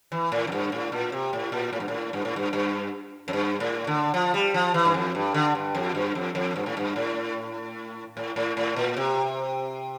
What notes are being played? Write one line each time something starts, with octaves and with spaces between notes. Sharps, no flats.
E3
A2
F2
G2
A2
A#2
C3
A2
A#2
A2
G2
A2
G2
A2
G2
G2
F2
G2
A2
D3
F3
G3
F3
E3
G2
F2
G2
D3
G2
F2
G2
F2
F2
G2
A2
G2
A2
A2
A2
A2
A#2
C3